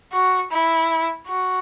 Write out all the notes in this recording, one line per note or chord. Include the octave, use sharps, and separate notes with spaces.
F#4
E4
F#4